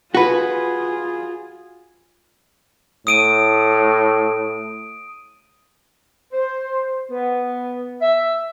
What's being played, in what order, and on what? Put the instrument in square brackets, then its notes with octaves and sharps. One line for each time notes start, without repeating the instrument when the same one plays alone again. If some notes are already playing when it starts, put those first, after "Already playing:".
[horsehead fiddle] F4 G#4 [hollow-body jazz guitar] F#4 B4
[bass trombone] A2 [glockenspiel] D#6 D7 D#7
[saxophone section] C5
B3
E5